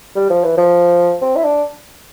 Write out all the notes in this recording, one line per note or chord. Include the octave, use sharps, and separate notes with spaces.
G3
F3
E3
F3
C4
E4
D4